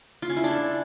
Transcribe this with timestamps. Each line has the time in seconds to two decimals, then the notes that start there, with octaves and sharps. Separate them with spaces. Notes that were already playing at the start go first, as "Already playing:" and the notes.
0.22 F4
0.30 C#4
0.37 E4
0.44 D4
0.51 A4